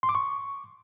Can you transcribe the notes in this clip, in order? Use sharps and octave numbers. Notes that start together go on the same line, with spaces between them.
C6
D6
C#6